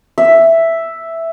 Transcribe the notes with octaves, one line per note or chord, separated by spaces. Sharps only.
E5